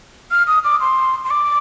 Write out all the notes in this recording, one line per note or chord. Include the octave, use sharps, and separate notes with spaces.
F6
D#6
D6
C6
C6
D6